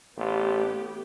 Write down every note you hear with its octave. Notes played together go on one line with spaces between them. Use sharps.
A1 A3 B3 G4